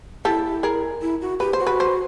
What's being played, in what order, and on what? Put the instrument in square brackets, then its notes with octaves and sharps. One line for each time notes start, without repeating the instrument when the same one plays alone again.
[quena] E4 [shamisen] G4 A4
[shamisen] G#4 A#4
[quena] E4
F#4
[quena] G4 [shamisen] B4
[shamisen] C5
[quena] F#4
[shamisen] B4
C5